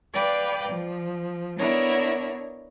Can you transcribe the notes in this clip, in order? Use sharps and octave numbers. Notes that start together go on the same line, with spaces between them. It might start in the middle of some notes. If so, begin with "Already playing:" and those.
B4 D5 F5 G5
F3
B3 D4 E4 A#4 C#5